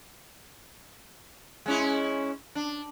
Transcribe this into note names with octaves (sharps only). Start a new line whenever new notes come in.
G#3 C#4 E4
D4